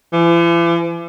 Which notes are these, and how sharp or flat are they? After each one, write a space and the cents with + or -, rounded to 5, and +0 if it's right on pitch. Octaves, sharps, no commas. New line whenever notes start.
E3 +45